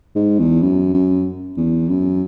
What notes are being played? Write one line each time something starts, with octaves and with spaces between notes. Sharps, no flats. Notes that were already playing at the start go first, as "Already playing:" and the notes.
G#2
E2
F#2
F#2
E2
F#2